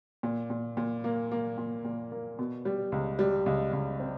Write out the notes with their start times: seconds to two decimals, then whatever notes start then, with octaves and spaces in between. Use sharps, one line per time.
0.23 A#2
0.50 A#2
0.77 A#2
1.04 A#3
1.32 A#3
1.58 A#2
1.85 A#2
2.12 A#3
2.39 B2
2.65 G3
2.92 C#2
3.19 G3
3.46 C#2
3.73 C#2
4.00 C4